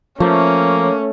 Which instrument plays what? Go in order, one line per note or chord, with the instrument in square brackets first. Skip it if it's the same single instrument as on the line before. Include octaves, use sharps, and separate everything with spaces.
[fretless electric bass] F3 [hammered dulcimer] A3 [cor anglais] A#3 [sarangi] C#4